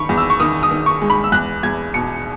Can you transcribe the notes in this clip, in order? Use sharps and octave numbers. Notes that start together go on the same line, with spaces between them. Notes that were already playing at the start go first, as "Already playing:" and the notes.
Already playing: D#3 B5 C#6
E2
E6
C#6
D#3 D#6
D#6
D#3
C#6
G#3
B5
E6
E2 F#6
E2 G#6
B2 C#7